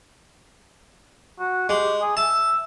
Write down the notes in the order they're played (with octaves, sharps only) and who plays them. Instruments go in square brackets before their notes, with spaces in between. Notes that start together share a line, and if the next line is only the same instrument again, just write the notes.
[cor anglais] F#4
[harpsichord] G#3 [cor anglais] G4
[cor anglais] G#4
[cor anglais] E5 [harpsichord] A5